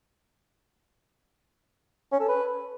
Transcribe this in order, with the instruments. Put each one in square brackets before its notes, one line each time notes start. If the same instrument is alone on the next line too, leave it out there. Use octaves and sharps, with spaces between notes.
[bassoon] C#4
A4
B4